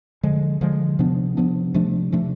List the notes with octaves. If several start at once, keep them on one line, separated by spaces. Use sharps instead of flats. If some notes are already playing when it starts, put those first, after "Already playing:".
D3 F3 G#3
D3 F3 G#3
C3 F3 B3 D4
C3 F3 B3 D4
C3 F3 A3 D4
C3 F3 A3 D4